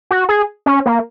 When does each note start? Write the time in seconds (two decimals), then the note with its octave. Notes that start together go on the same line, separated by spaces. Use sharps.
0.11 F#4
0.29 G#4
0.66 C#4
0.86 A#3